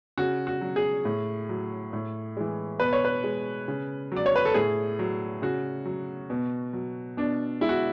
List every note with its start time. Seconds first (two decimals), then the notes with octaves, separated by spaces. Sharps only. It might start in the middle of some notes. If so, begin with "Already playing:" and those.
0.18 C#3 F#4
0.47 F#4
0.61 F#3
0.76 G#4
1.05 A2
1.49 F#3
1.93 A2
2.37 E3 G#3
2.79 B2 B4
2.93 C#5
3.05 B4
3.24 G#3
3.68 C#3
4.12 F#3 D5
4.26 C#5
4.36 B4
4.45 A4
4.54 A2 G#4
4.99 F#3
5.42 C#3 F#4
5.86 F#3
6.30 B2
6.73 F#3
7.17 B2 D4
7.61 G#3 E4
7.69 F#4